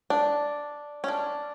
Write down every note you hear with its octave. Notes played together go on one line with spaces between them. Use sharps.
D4
C#4
D4